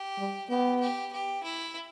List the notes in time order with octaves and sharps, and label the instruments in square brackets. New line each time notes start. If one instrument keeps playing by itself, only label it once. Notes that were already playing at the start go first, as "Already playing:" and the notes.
Already playing: [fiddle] G4
[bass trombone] G3
[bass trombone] B3 [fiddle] G4
[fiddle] G4
G4
E4